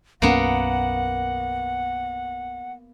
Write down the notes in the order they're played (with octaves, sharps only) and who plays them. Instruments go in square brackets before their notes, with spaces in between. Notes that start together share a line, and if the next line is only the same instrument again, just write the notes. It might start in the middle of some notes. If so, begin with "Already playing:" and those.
[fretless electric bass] B1 F#2 C#4 [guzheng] A#3 B3 [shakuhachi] F#5